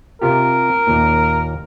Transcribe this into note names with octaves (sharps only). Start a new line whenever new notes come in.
C3 F4 G4 A#4
D#2 A#2